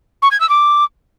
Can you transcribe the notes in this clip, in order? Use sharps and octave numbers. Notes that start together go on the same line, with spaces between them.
C#6
G#6
E6
D6